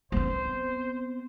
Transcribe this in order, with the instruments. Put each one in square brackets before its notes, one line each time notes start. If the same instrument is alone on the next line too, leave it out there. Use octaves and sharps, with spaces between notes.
[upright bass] B3 C4 [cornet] C5